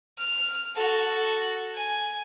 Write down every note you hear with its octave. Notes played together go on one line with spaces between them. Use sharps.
F6
F#4 A4
G#5